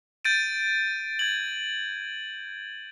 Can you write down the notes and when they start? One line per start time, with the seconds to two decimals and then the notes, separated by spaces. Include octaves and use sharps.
0.25 G6 A6 D7 D#7
1.19 G#6 F#7